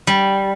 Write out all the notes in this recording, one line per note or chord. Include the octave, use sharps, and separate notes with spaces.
G3